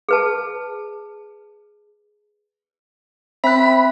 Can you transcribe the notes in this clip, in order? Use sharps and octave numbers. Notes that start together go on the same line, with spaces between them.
G#4 B4 A5
C4 E5 B5 F#6